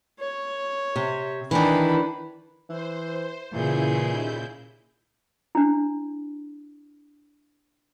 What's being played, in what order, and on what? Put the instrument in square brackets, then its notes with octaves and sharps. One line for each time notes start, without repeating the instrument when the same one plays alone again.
[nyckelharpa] C#5
[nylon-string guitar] C3
[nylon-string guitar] D#3 E3 [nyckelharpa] D4 B5
[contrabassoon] E3 [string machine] C5
[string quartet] A#2 G#4 [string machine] C#3 E4 G6 [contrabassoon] E3
[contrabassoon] D#2
[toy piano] D4 E4